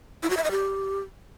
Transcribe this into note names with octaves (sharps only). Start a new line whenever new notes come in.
E4
F#4
E5
D#5
G4